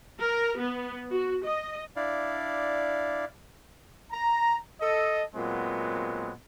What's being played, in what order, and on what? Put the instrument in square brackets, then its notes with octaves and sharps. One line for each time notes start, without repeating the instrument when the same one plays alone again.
[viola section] A#4
B3
F#4
D#5
[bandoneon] D4 E4 D5 F5
[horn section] A#5
A4 D#5
A#2 F#3 G#3 B3 C4